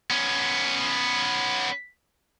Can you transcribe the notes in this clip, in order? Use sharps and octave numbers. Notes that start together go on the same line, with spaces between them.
B3 C#4